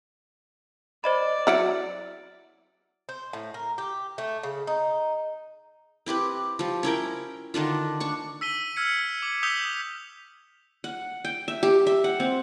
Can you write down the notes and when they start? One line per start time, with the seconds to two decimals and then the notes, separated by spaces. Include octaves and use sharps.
1.04 C5 D5 D#5 B5
1.47 F#3 E4 F6 C#7 D7
3.09 C5
3.33 A2
3.54 A#4
3.78 G4
4.18 A3
4.43 C#3
4.67 D#4
6.06 C4 E4 G4 B4
6.59 F3 G3
6.83 C#4 E4 A#4 G5
7.54 D3 D#3 D4 F4
8.00 D4 C#6
8.41 E6 B6 D#7 G7
8.76 E6 F6 G#6 C#7
9.22 D6
9.43 D#6 E6 G6 B6 F7 G7
10.84 F#5
11.25 G5
11.48 E5
11.63 G4
11.87 E5
12.04 F#5
12.20 C4